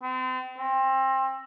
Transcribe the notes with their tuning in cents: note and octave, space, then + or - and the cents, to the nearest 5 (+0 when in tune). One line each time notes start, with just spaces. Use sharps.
C4 -35
C4 +25